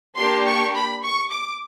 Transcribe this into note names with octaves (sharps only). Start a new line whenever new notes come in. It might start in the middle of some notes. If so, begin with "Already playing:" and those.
A#3 D4 G4 C6
C#6
B5
C#6
D6